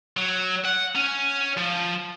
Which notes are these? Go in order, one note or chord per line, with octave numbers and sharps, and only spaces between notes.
F#3
F#5
C#4
F3